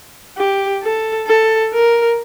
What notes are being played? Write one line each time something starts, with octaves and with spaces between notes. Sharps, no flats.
G4
A4
A4
A#4